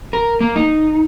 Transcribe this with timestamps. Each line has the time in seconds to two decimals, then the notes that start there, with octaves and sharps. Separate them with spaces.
0.13 A#4
0.41 A#3
0.56 D#4